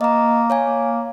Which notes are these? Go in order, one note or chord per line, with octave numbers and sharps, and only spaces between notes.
A#3 D#5 A#5
C#5 F5 G#5
A#3